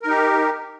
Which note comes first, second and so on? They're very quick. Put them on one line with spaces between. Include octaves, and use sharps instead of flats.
A#4 D#4 G4